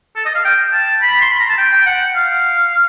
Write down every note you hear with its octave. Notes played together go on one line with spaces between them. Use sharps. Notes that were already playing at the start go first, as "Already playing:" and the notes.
A4
D#5
F5
G5
A5
B5
C6
B5
A#5
A5
G5
G5
F#5
F5